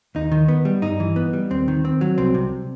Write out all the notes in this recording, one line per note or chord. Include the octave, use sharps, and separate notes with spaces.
D#2 D#4
D#3
B3
G3
G2 D#4
E3
B3
G3
D#2 C4
D#3
C4
F#3
C2 C4
C3